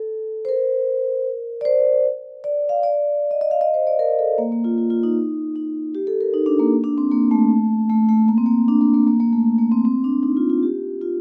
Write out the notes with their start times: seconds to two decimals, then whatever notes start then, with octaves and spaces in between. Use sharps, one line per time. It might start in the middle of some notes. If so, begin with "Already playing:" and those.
Already playing: A4
0.45 C5
0.49 A#4
1.61 D5
1.65 C5
2.44 D5
2.69 F5
2.83 D5
3.31 D#5
3.41 D#5
3.51 F5
3.61 D#5
3.74 C5
3.87 D5
3.99 A#4
4.19 A4
4.38 A#3
4.52 A#3
4.64 F4
4.78 F4
4.90 F4
5.03 D#4
5.56 D#4
5.95 G4
6.07 A4
6.21 A#4
6.34 D#4
6.46 D4
6.59 A#3
6.84 D4
6.98 C4
7.12 A#3
7.31 A3
7.90 A3
8.09 A3
8.28 A#3
8.38 C4
8.46 A#3
8.68 D4
8.81 A#3
8.94 A#3
9.07 A#3
9.20 A#3
9.33 A3
9.58 A#3
9.72 C4
9.85 C4
10.04 D4
10.23 D#4
10.37 F4
10.50 F4
10.63 G4
11.01 F4